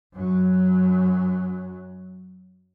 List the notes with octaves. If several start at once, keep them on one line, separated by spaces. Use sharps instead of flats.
F#2 F#3